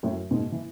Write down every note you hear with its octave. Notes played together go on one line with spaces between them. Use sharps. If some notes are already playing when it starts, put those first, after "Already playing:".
F#2 A2
G#2 B2
E3